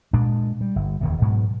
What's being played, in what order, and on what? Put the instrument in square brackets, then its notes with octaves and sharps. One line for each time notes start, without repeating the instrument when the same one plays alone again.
[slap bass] A#2 G#3 D4
G3
G1
E1 D#2 C3
G#2 B2 F#3 G#3